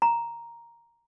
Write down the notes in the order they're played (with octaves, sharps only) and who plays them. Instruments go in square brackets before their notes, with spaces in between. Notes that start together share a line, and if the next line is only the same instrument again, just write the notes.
[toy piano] A#5